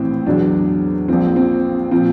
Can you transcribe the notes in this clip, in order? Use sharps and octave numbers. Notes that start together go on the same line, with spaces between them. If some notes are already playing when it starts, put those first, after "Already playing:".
Already playing: A#1 A2 E3 C4
E2 B2 F#3 D4
A#1 A#2 F3 C4
C4
A#2 F3 C4